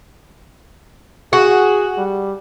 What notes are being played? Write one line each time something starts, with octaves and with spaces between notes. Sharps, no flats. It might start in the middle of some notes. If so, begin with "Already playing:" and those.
F#4 G#4
G3